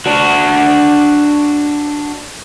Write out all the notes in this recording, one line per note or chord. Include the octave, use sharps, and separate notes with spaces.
D4 F#4